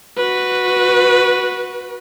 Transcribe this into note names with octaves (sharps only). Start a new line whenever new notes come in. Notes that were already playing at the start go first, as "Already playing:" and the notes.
F#4 B4